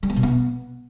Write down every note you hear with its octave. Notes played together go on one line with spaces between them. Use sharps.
G3
B3
B2
B3